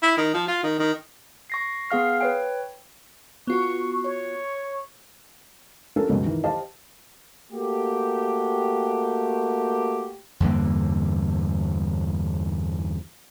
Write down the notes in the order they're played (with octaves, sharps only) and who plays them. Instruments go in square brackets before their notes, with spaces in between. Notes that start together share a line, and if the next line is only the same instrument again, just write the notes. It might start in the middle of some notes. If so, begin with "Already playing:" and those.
[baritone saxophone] E4
D#3
F3
F4
D#3
D#3
[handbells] C#6 A#6 C7
B3 G#4 F5 F6 C7
B4 C#5 G5
[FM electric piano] B3 F4 F#4 [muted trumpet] C#6
[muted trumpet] C#5
[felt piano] C#4 D4 F4 G4 A4 A#4
C#2 F#2 B2 G3 G#3
D#3 E3
G4 C5 D#5 F5 A5
[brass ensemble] A3 A#3 F#4 G4
[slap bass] E2 G2 D3 A#3